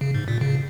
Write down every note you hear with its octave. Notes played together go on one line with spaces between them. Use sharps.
C#3
G#2
A#2
C#3